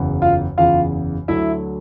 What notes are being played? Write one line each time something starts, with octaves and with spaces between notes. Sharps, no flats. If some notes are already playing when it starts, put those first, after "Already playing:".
Already playing: F#1 E2 C#3
F4 F5
F#1 E2 C#3 F4 F5
D2 D3 F#3 E4 E5